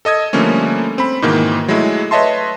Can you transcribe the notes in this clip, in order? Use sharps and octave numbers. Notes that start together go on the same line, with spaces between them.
A4 D#5 D#6 G#6
D3 F3 G3 A3 A#3 C#4
C4 B5
G#2 B2 D#3 E3 A#3
F#3 G#3 A3 E4
B4 C#5 D#5 E5 A5 C6